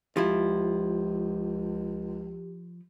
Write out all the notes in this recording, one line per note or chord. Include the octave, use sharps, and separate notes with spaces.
C#2 F3 E4 G4